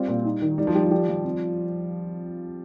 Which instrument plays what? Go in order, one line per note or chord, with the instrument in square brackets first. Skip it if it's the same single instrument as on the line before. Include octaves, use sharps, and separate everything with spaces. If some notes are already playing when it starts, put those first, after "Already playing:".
Already playing: [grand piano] G3 [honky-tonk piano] C4 F4
[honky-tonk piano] A#2
D#4
D#3
[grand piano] G3 [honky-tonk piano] D#4
[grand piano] F3
[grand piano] G3 [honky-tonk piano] G4
[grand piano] F3
[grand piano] G3 [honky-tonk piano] G4
[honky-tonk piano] F3
C4